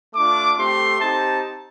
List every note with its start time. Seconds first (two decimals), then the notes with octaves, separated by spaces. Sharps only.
0.14 A3 D4 F4 D6
0.57 A3 C4 G4 C6
1.01 C4 D#4 G4 A5